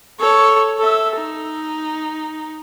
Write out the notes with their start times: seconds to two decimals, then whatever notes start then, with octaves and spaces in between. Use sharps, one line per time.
0.20 A4 C#5
0.78 A4 E5
1.16 D#4